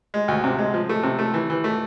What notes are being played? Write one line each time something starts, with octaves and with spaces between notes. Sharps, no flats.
G#3
D2
C3
G#3
F3
A3
C3
A3
E3
E3
A3